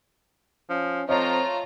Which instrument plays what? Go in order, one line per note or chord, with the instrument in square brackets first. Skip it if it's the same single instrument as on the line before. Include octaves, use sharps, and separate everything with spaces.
[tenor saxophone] F3 [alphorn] C#4
[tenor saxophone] F3 [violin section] A3 F4 A#5 [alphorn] C4 [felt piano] C#5 D#5 C#6